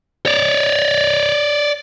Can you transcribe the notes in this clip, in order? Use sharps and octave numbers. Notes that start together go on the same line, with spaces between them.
C#5 D5